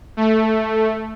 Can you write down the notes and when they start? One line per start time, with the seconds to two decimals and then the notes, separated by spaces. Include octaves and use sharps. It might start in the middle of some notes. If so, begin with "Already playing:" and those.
0.17 A3